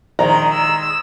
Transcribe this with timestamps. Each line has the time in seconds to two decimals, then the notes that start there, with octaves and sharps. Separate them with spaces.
0.19 A#1 D#3 G#3 A#5
0.53 E6